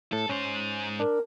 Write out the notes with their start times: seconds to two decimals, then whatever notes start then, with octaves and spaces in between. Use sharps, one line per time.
0.12 A2 A4
0.29 G#2 C#4 C5
1.00 D4 A#4